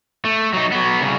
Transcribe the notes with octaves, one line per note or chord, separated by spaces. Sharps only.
A3
F#3 D#4
F#3 B3
C2 C#3